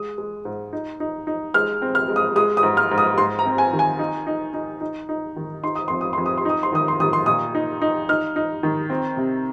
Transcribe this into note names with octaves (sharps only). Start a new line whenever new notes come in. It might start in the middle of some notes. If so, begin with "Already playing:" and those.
Already playing: G#3 D#6
G#3
G#2
D#4
D#4
D#4
G#3 F6
C4
F6
G#3
D#6
G#3 D#6
D#6
G#2
F6
G#2
D#6
G#2 C6
A#5
C4
G#5
D#3
G#5
D#4
D#4
D#4
D#4
D#4
D#3
D#4 C6
D#6
F2 C6
D#6
F2 C6
D#6
C6
D#4 D#6
C6
D#3 D#6
C6
D#3 D#6
C6
A#2 D#6
D#4
D#4
D#4 F6
D#4
D#3
C4
C3